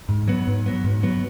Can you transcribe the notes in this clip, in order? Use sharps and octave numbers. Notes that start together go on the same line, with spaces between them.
G#2
F#3 B3
G#2
F#3 B3
G#2
F#3 B3